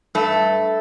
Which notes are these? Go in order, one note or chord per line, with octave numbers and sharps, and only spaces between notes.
G2 A3 A4